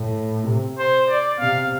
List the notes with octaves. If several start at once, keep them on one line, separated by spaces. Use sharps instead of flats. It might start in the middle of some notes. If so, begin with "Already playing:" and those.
Already playing: A2
C3
C5
D5
C3 F5